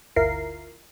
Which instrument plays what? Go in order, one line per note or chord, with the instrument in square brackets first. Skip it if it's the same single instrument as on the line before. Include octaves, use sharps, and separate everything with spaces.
[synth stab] G1 D2 E4 F4 A#4 C7